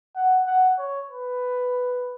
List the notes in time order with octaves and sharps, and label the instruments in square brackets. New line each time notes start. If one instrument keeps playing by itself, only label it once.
[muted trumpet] F#5
F#5
C#5
B4